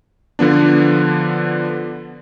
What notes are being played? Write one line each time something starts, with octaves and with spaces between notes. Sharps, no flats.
D3 F3 B3 D4